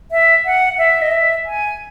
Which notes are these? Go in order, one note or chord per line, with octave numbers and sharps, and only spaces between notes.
E5
F#5
E5
D#5
E5
G#5